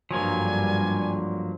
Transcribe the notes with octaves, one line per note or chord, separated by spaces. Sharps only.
G#1 G2 D3 F3 F#3 A#3 G#5